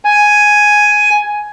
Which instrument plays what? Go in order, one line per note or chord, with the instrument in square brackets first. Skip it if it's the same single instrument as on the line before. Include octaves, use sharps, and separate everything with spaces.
[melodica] G#5